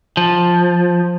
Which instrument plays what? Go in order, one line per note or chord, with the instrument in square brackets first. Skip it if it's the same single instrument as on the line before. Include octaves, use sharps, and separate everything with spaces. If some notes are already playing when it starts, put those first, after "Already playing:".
[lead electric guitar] F3